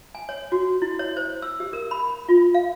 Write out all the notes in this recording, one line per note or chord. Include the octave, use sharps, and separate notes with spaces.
G#5
C#5
F#4
E4
C#5
C5
E6
G4
A#4
B5
F4
F5